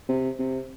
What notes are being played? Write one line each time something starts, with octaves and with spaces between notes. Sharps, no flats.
C3
C3